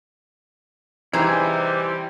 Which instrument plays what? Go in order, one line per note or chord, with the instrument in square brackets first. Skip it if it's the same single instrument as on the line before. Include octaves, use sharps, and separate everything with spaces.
[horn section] C3 G3 [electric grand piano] E3 [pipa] D#4 G#4 [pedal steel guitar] E4 C5